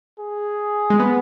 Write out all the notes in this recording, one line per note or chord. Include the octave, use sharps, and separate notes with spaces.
G#4
G#3
B3